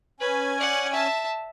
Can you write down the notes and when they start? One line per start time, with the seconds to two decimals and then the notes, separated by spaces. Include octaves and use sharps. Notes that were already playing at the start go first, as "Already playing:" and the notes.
0.20 C#4 B4 G#5
0.60 D5 F#5
0.92 E5 A5